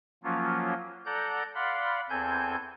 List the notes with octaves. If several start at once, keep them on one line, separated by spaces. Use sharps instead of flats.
F3 F#3 A#3 C#4 F4
A4 D5 F#5 A#5 G6
D5 F5 F#5 B5 C6
E2 C4 A4 G#5 G6